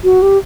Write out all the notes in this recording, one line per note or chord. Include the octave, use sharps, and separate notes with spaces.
F#4
G4